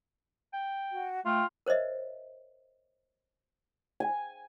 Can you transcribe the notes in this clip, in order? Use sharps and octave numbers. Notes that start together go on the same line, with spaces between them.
G5
F#4
A3 F4 G5
A#4 C5 C#5 D#5 E5
G#5